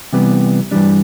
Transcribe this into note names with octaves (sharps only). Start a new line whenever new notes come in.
C3 E3 G3 B3
G2 E3 G3 D4